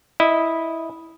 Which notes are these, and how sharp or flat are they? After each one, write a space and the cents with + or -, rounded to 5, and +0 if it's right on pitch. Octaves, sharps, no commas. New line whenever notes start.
E4 -10 D#5 +0